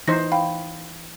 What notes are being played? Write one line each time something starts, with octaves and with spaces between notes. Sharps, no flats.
E3 D#4 C5 A#6
F5 G5 B5